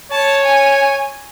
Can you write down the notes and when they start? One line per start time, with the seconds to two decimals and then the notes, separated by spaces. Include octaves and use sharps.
0.12 C#5 A5
0.44 G#5